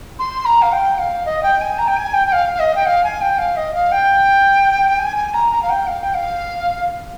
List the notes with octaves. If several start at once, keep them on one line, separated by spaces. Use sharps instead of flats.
C6
A#5
F5
G5
F5
D#5
G5
G#5
A#5
G5
G#5
G5
G5
F5
F5
D#5
G5
F5
G#5
G5
F5
D#5
F5
G5
G#5
G#5
A#5
A#5
F5
G5
F5
G5
F5